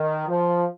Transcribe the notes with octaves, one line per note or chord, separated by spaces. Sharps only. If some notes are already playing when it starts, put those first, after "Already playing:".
Already playing: D#3
F3